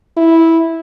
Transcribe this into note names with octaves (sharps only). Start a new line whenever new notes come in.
E4